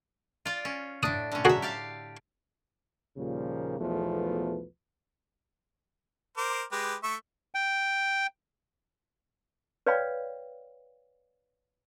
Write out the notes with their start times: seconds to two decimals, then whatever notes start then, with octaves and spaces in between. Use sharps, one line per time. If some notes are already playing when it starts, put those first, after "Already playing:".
0.45 F4 D5
0.65 C#4
1.03 A2 D4 D#6
1.32 D3 C#4
1.45 F#3 F#4 G#4 E5
1.62 G4 D5 F5
3.17 D#2 A#2 C#3 F3 G3 A#3
3.80 B1 E2 F3 A3 B4
6.37 A#4 C5 D6
6.72 G#3 G4 B4
7.03 A3 E5 C#6
7.55 G5
9.87 B4 C#5 D5 F5 G5 B5